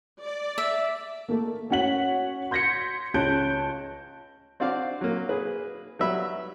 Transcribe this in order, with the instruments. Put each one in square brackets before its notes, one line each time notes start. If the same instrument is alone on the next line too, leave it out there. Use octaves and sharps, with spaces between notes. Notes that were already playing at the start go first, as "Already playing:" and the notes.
[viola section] D5
[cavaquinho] E5
[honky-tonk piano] A3 A#3
C#4 F#4 C#5 F#5 B6 F#7
C6 G6 G#6 A#6 B6 C#7
C#2 C#4 A5 F#6 G6 D7
[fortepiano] C4 D4 F#4 D5 F5
F#3 A#3
G#4 B4
F#3 G3 B3 E5 B5